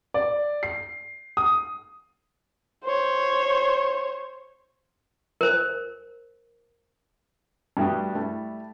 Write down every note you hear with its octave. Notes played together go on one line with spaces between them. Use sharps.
D5
C7
D#6
C5 C#5
A#4 C5
G2 G3 A3 F#4 G4 D#6
G3 A3 E4